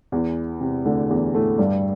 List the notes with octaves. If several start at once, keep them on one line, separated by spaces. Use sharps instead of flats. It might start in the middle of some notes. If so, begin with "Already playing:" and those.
E2 E3
C3
D2 D3
E2 E3
A2 A3
G2 G3